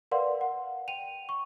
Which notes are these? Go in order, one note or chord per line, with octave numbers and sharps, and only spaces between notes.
A#4 B4 D5 F5 F#5 C6
F#5
G5 D#7 F7
C#6